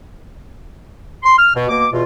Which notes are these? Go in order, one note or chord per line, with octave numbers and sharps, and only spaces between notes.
C6
F6
B2
B2 A#3 D6
E2 B2 F4